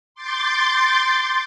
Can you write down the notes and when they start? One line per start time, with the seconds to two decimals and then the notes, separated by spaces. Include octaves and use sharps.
0.15 C6 D6 G6 A6